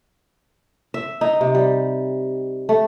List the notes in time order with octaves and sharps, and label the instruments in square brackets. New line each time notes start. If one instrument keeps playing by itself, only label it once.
[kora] E5
D#4
C3
G3
A3